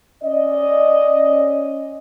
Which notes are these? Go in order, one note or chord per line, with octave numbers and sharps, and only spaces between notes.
C#4 D5 D#5